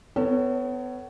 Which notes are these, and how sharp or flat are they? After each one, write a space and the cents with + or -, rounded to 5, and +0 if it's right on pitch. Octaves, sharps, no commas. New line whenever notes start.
B3 +30 A4 +45 C#5 +0